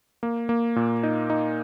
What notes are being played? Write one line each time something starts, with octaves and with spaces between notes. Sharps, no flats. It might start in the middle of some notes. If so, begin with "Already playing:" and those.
A#3
A#3
A#2
D#4
D#4